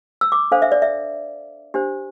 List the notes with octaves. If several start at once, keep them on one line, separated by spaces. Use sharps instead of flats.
E6
D6
D4 A4 C5 F5
E5
D5
E5
D4 G4 C5